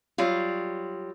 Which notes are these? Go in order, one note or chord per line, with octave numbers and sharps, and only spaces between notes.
F#3 G3 F4